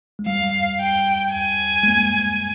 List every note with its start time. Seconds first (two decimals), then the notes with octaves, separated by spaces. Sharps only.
0.19 G#3
0.27 G3 F5
0.80 G5
1.34 G#5
1.84 G#3
1.88 A#3